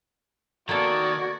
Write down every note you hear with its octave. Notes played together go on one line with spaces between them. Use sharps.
D#3 A#3 B3 F#4 A4 D5 G#6